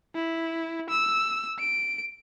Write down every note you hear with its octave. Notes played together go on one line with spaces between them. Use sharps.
E4
E6
D7